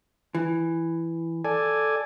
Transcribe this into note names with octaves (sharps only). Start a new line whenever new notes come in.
E3
A4 D5 G#5